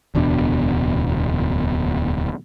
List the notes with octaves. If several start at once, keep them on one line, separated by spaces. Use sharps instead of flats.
D1 E2 B2 D4